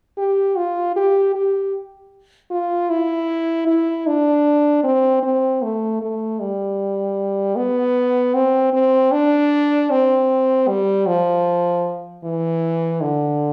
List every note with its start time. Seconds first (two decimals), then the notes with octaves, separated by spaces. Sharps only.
0.18 G4
0.56 F4
0.96 G4
1.35 G4
2.51 F4
2.90 E4
3.67 E4
4.07 D4
4.84 C4
5.23 C4
5.63 A3
6.01 A3
6.40 G3
7.56 B3
8.35 C4
8.73 C4
9.12 D4
9.90 C4
10.68 G3
11.07 F3
12.24 E3
13.01 D3